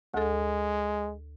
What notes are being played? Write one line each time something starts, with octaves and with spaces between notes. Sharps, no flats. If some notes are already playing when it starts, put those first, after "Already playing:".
D2 G#3 A4